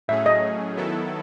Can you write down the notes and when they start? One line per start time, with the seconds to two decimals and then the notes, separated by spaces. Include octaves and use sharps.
0.08 A2 F#3 A3 C#4 G#4 E5
0.26 D#5
0.76 D#3 F#3 B3 E4 A4